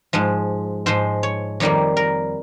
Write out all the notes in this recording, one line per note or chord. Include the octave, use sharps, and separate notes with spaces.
G#2 F3 G#3
G#2 F3 G#3 C5
C#5
F2 D#3 G3 A#3 C#5
A#4